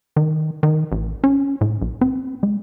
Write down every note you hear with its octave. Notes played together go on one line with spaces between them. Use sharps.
D#3
D#3
A1
C#4
A2
B1
C4
G#3